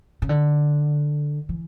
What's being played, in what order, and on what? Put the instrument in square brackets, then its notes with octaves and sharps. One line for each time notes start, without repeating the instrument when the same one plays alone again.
[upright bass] C#3
D3
E3